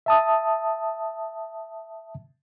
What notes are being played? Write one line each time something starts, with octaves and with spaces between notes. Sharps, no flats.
E5 A5 D#6